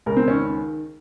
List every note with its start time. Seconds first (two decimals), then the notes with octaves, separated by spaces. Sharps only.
0.06 C#2 A#4
0.17 C4
0.27 D#3 C#4